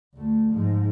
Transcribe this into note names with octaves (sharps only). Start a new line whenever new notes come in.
D2 A3
G#2 F3